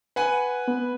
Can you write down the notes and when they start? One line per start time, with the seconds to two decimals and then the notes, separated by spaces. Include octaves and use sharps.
0.16 B4 F#5 G#5
0.67 B3